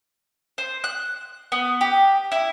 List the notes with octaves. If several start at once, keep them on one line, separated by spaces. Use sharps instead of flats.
C5
F#6
B3
G4
E4